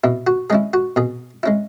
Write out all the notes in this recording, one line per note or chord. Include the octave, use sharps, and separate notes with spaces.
B2 E4
F#4
G#3 C#4 E4 G#4
F#4
B2 G#4
G#3 C#4 E4